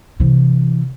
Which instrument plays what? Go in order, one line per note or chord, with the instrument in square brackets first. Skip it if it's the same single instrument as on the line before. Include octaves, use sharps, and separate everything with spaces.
[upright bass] C3 E3